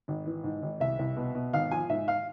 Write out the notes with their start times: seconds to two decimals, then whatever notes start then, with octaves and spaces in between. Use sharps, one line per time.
0.08 G#1
0.26 E3
0.44 G#2
0.62 G#1
0.80 C2 E5
0.99 C2
1.17 B2
1.35 B2
1.53 G#1 F5
1.71 F3 G#5
1.90 G#2 E5
2.08 F5